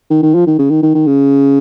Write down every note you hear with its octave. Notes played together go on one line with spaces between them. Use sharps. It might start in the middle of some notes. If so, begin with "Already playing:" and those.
D#3
D#3
F3
D#3
C#3
D#3
D#3
D#3
C#3